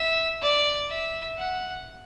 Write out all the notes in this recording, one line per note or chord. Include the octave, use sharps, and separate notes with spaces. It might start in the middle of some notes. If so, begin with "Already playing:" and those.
Already playing: E5
D5
E5
F#5